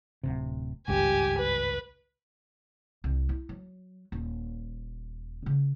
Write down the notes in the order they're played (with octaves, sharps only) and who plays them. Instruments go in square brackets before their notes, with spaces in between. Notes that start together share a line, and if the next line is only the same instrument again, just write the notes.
[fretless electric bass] D1 G1 C3
[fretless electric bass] G#1 C#2 G2 [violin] G4 G#5
[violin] B4
[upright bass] C2
E4
F#3
D#1
C#3